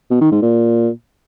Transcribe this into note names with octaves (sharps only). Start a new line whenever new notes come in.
B2
D#3
G#2
A#2